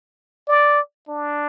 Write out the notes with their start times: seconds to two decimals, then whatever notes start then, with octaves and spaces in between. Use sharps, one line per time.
0.48 D5
1.09 D4